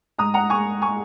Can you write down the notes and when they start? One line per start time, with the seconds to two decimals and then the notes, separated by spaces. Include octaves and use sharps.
0.18 G#2 G#3 A#5 D#6
0.34 F#5 A#5
0.50 G#2 G#3 G#5 C#6
0.82 G#3 G#5 C#6